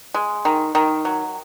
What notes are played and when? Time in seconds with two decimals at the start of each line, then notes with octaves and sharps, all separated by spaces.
0.14 G#3
0.45 D#3
0.75 D#3
1.05 F#3